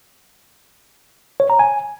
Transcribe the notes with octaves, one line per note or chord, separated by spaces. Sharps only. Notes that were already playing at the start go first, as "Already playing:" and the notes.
C#5
A#5
G#5